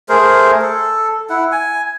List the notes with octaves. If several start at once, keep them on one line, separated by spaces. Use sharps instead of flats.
A3 G#4 A#4 C5
A4
E4 F#5
G#5